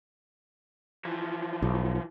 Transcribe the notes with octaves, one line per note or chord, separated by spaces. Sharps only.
E3 F3
B1